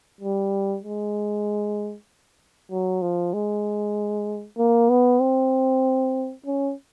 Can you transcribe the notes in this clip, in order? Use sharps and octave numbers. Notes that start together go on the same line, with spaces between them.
G3
G#3
F#3
F3
G#3
A#3
B3
C4
C#4